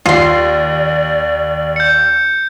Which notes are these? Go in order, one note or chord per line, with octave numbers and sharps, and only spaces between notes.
D#2 F4 D5 C6
G6 C#7